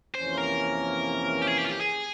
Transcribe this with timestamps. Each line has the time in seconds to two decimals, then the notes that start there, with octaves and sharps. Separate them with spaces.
0.15 F2 C3 E3 A#3 C#4 C5
0.37 A#4
1.42 G4
1.47 G#4
1.58 G4
1.65 F4
1.70 G4
1.81 G#4